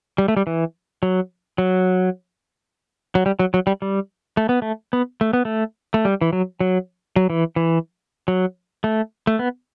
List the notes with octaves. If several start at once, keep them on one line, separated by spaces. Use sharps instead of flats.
G3
A3
G3
E3
F#3
F#3
F#3
G3
F#3
F#3
G3
G3
A3
B3
A3
B3
A3
B3
A3
A3
G3
E3
F#3
F#3
F#3
E3
E3
F#3
A3
A3
B3